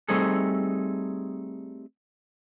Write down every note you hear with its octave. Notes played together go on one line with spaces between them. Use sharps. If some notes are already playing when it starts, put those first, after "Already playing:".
G3 A3 C4 D#4 G#4 A4